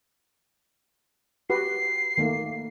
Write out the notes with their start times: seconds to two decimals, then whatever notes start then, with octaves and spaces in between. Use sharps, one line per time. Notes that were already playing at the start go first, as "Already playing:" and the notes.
1.50 F#4 G4 B4 C7
2.18 D#3 A3 A#3